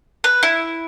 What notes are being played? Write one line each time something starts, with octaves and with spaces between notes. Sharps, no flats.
B4
E4